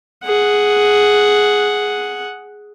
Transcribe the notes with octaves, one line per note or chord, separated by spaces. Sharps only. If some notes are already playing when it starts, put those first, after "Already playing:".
G#4 F#5